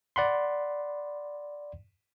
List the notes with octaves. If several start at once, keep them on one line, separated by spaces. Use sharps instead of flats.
D5 F#5 B5 C6